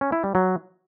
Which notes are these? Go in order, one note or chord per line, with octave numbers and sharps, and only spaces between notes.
C#4
E4
G3
F#3